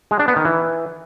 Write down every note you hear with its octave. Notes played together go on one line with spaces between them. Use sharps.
G#3
D4
B3
D#3
E3